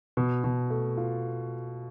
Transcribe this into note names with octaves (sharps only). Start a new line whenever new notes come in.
B2
B2
A3
F4